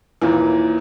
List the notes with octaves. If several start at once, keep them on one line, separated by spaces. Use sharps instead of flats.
D#2 A#2 E3